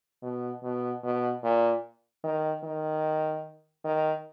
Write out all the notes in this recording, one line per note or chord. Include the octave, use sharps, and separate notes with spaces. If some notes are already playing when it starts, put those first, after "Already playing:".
B2
B2
B2
A#2
D#3
D#3
D#3